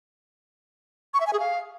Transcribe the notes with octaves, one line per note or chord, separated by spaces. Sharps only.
C#6
E5
G#5
G#4
F5